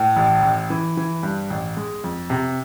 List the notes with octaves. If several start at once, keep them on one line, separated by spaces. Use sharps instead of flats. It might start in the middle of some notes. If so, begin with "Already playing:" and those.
Already playing: A2
A1
A1
E3
E3
G2
A1
G#3
F2
C3